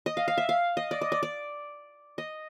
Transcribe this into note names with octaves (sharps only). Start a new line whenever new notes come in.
D#5
F5
F5
E5
F5
D#5
D5
D#5
D5
D5
D#5